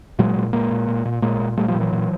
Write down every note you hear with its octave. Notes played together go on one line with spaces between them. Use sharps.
A#2 F#3 G#3
A#2
A#2 G#3 A#3
A#2
A#2
A#2
A#2 G#3 A#3
A#2
A#2 G3 A3
F3 G3
A#2
E3 F#3
A#2